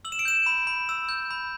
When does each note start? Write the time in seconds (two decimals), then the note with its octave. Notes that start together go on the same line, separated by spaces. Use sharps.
0.05 E6 F#7
0.12 E7
0.19 D7
0.25 G6 E7
0.46 B5
0.67 B5
0.89 E6
1.09 G6
1.31 B5